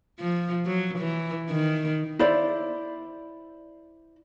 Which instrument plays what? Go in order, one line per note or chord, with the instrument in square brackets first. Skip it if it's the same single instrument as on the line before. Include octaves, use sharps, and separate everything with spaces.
[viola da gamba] F3
F#3
E3
D#3
[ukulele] E4 C5 D5